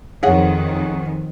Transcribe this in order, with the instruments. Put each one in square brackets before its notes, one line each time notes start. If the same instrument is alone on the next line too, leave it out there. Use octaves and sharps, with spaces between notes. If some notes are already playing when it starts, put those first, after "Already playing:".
[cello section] F2 D#3 [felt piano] G#4 C#5 F#5